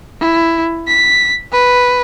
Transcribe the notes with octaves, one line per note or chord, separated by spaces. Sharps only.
E4
B6
B4